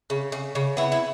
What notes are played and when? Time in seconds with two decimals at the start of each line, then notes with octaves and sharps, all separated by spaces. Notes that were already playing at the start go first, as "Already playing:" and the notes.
0.10 C#3
0.32 C#3
0.55 C#3
0.77 B3 E4
0.92 E4